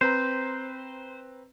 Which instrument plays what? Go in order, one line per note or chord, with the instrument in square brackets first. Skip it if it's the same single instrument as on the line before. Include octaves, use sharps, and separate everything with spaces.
[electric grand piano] C4 B4 A#5 [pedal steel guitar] C5